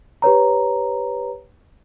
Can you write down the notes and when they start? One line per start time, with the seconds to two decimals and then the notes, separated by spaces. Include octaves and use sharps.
0.22 G4 B4 C#5 A#5